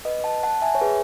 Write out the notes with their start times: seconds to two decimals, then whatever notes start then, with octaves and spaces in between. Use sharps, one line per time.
0.05 B4 D#5
0.24 F#5 A5
0.43 F#5 A5
0.62 E5 G#5
0.75 C#5
0.81 G#4 B4